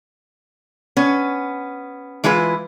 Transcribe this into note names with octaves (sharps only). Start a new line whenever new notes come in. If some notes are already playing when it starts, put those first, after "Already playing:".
B3 C#4
E3 G#3 E4 F4 B4